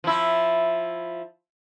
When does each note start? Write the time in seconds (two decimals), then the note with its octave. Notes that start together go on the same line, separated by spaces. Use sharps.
0.04 F3 E4